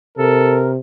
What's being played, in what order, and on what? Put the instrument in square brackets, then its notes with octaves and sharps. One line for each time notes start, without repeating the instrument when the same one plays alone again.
[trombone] C3 [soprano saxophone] A4 [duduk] A#4